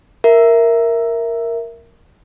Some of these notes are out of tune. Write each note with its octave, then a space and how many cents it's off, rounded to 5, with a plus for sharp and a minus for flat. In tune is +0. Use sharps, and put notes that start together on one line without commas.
A#4 +0 E5 +5